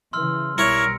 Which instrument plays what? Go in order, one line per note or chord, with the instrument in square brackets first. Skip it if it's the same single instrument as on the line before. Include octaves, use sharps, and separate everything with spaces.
[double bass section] C#3 E3 [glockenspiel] C6 E6 F6
[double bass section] B1 G3 [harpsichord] E4 C#5 [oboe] A#4 [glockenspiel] C#7